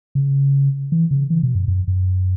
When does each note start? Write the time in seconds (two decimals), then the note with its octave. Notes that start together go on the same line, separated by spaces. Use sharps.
0.15 C#3
0.92 E3
1.11 C#3
1.30 E3
1.43 B2
1.55 F#2
1.68 F#2
1.88 F#2